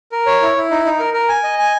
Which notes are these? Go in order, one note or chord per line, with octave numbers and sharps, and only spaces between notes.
A#4
C#5
E4
E4
D#4
D#4
A#4
A#4
G#5
D#5
G#5